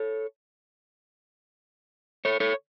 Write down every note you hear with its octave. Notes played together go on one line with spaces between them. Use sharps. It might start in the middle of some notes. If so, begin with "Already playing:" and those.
Already playing: A4 C#5
A4 C#5
A4 C#5